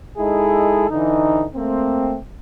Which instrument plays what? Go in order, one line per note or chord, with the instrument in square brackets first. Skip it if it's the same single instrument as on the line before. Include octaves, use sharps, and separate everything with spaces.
[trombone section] G#3 D#4 E4 G#4 A4
D3 E3 D#4
A3 A#3 C4